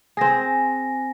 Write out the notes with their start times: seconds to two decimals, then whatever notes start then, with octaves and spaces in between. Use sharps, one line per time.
0.17 C4 G#4 G#5 A#6